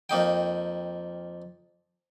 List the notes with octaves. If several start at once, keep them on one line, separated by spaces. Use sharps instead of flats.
F2 A#3 D#4 G5